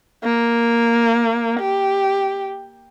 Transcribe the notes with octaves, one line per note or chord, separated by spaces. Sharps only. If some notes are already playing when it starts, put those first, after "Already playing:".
A#3
G4